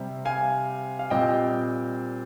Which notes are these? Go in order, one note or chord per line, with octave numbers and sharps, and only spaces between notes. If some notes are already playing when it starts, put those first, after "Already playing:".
Already playing: C3 G3 C4
F5 G#5
F5
A#2 G3 C4 D#5 G5